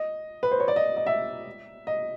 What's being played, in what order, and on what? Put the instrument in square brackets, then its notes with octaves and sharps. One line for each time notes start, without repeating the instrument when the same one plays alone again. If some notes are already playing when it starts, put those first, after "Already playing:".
Already playing: [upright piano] D#5
B4
C5
C#5
D5
D#5
D#5
E5
D#5